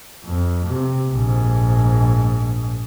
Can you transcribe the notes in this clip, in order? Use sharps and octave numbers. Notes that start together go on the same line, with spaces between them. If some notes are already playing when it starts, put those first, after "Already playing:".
F2
C3
A#1 G#2